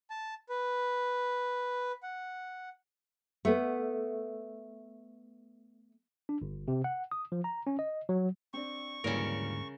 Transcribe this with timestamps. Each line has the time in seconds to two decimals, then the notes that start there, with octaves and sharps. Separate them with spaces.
0.10 A5
0.49 B4
2.03 F#5
3.45 A3 B3
6.29 D4
6.42 G1
6.68 C3
6.84 F#5
7.11 D#6
7.32 F3
7.44 A#5
7.67 C#4
7.79 D#5
8.09 F#3
8.54 C4 D4 C#6
9.04 D2 G#2 C#3 E3 F#3 G3 A#3 A#4